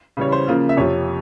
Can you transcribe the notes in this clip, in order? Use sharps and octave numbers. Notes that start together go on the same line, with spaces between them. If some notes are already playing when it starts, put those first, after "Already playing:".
C#3 E3 G3 C#5
C5
C#3 F3 A#3 F4
E5
F2 C3 F3 C#5